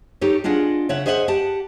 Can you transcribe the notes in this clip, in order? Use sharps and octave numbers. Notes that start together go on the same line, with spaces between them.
D#4 G4 A4 C#5
D4 F4 G#4 D#5 F#5
C#3 C#5 E5 F#5
G#4 C5 D#5 E5 F#5
G4 F#5 A5